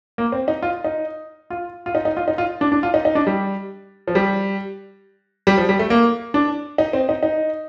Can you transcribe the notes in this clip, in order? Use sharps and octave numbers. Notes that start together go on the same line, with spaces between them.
A#3
C4
D#4
F4
D#4
F4
F4
D#4
D#4
F4
D#4
F4
D4
D4
F4
D#4
D#4
D4
G3
F3
G3
G3
F3
G3
A3
A#3
D4
D#4
C4
D#4
D#4